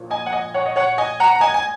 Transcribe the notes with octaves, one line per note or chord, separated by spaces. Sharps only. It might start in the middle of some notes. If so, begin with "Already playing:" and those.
Already playing: A#1 A#2 F#3
D#5 G#5
F#5
D#5 G#5
C#5 F#5
D#5
C#5 F#5
D#5 G#5
F#5 A#5
A#5
D#5 G#5
G#5